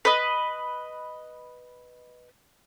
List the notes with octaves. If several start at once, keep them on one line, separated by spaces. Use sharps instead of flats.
B4 D#5